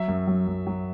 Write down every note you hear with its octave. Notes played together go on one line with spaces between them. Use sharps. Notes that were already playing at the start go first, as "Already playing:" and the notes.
Already playing: F#3 E5
F#2
F#3
F#2
F#3